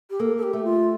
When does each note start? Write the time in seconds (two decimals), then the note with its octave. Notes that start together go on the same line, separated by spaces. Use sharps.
0.10 G4
0.20 A#3 A4
0.37 A4
0.43 G4
0.53 A3
0.64 F4